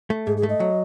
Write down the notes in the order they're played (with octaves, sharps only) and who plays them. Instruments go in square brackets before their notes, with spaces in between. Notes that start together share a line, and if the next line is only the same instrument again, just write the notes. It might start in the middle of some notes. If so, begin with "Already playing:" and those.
[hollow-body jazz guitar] A3
[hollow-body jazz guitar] G#2 [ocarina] G#4
[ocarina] G#4
[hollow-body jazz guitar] A3
[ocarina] D#5
[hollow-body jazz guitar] F#3